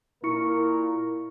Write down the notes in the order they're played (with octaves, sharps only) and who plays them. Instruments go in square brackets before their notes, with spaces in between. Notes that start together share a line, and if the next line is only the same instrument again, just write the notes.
[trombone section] A#2 A#3 A#4 [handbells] E4 C#6 C#7